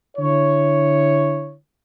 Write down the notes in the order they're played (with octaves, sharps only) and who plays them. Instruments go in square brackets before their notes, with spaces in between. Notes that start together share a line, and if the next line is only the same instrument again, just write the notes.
[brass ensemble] D3 E4 C#5